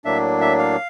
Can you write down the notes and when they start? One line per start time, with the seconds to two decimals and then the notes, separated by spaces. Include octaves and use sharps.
0.04 A2 F#3 A#3 D4 E5
0.41 E5
0.59 F5